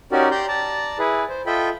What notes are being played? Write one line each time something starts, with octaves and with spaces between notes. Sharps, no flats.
C#4 D#4 F#4 G4 A#4 D5
G4 D5 A#5 C6 G6
D5 A5 A#5
E4 G#4 B4
C5
F4 A4 D#5 E5 G5 B5